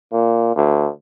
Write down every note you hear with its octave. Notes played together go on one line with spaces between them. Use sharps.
A#2
D2